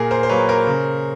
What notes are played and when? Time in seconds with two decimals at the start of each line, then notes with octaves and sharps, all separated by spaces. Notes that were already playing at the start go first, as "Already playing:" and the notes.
Already playing: A#2 G#4 A#4
0.11 A#4 C5
0.23 C5
0.29 F#3 A#3 B4 C#5
0.49 A#4 C5
0.67 C#3